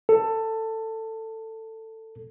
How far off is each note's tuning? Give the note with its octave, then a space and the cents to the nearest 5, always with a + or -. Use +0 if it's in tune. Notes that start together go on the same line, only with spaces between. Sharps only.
A4 +15